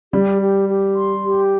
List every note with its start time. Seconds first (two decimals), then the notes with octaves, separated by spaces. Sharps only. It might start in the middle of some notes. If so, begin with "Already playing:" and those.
0.12 G3 G4
0.41 G4
0.68 G4
0.96 C6
1.23 G4